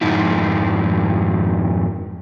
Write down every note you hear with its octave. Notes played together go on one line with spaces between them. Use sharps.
F2 G#2 D#4 E4